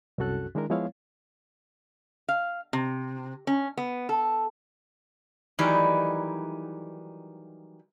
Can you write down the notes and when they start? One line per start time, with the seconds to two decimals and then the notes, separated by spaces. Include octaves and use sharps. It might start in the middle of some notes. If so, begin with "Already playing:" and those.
0.18 C2 F#2 C#4 F#4 A4 F#6
0.55 D#3 G#3 D4 E4 A#4
0.70 F3 G#3 B3 E4 C#5 F5
2.29 F5
2.73 C3
3.47 C#4
3.77 B3
4.09 A4
5.59 D#3 E3 F#3 G3 A3 D#4